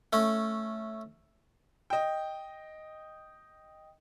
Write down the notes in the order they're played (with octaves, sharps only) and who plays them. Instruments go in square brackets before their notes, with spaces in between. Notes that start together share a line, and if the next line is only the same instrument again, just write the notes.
[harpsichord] A3 C#4
[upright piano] D#5 G5